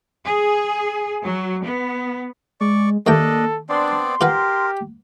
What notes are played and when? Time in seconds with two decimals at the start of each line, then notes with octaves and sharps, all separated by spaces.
0.25 G#4
1.23 F#3
1.65 B3
2.61 G#3 D5 C#6
3.07 D#2 A3 A#3 D4 A4 D#5 G5
3.69 B3 C4 D4 D5 C6
4.21 F4 G4 A#4 B4 F#5